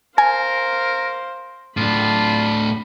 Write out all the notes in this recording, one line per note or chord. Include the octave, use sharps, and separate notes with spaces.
A#4 C5 F5 G#5
A2 D4 F4 B5